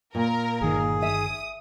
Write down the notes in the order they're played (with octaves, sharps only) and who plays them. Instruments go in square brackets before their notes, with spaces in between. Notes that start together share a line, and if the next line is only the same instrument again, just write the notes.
[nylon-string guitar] A#2 [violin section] A#4
[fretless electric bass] G1 D#3 [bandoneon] G#4
[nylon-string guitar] E5 [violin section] D#6